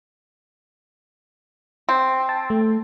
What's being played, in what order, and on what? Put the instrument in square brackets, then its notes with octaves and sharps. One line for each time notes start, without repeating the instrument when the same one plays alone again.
[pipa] C4
[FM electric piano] A5
A3